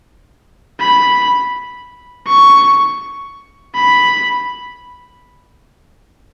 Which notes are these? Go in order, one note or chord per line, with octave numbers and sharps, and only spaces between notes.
B5
C#6
B5